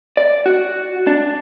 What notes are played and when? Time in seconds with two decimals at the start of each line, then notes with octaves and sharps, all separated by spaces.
0.17 D5
0.46 F#4
1.07 D4